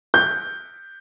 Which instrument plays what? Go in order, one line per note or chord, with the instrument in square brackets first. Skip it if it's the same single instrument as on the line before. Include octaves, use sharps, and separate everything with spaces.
[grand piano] G6